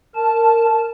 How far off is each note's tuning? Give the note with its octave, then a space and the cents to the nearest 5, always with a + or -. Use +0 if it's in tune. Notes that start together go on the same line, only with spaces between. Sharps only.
A#4 -15 A5 -5